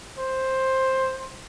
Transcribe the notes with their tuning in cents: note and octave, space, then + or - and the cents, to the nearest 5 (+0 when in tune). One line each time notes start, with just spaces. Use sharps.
C5 +10